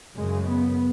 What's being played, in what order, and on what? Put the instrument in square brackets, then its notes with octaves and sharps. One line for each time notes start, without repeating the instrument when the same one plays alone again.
[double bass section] F#2 C#3 G#3
B3